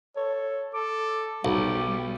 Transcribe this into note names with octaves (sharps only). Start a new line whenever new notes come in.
A4 C#5
A4 D6
B1 G3 B3 D6